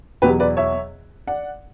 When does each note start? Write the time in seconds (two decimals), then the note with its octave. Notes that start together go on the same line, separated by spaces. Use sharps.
0.22 E2 B2 F#3 G4 B4
0.40 B4 D5
0.57 C#5 E5
1.27 D5 F#5